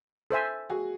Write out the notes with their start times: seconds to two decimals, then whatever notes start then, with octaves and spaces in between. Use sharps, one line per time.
0.31 A4 C5 E5 G#5
0.70 F#4 G#4